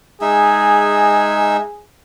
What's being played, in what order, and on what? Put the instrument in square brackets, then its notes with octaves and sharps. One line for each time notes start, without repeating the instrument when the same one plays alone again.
[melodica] G#3 D#4 E5 [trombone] G#4